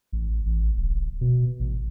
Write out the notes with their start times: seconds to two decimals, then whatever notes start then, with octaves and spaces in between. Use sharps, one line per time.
0.13 A1
0.46 A1
0.77 D1
1.21 B2
1.60 A1